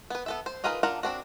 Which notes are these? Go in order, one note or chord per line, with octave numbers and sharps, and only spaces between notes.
B3 B4
B3 A4 E5
C5
D#4 F4 G#4 A#4 B4
D4 F4 A#4 F#5 A#5
C4 D4 F#4